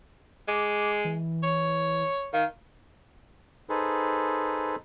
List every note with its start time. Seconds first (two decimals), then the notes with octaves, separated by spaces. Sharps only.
0.48 G#3 D6
1.05 E3
1.43 C#5
2.33 D#3 F5
3.69 D#4 G#4 A4 B4 C5